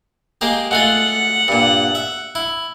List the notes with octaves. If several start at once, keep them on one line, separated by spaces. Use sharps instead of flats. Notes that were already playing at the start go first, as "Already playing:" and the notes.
G#3 A#3 G4
G#3 A3 F4 F#5
G2 A#2
E5
E4